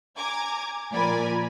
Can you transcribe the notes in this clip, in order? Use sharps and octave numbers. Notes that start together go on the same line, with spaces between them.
G#5 A#5 D6 G#6
A#2 F3 A#4 D5 G#5 B5